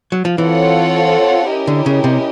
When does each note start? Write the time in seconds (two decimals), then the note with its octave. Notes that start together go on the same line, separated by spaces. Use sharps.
0.12 F#3
0.25 F3
0.38 E3 C4 F4 A4 C#5 F#5
1.49 C#4 E4 G4 A#4 D#5
1.67 D3
1.86 C#3
2.04 C3